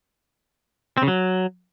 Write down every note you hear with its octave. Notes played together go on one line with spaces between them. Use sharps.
C4
C#3
F#3